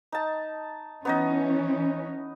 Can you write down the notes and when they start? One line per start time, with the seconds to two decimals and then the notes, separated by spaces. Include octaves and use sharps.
0.12 D#4 A5
1.05 E3 B3 C#4 D#4 D#5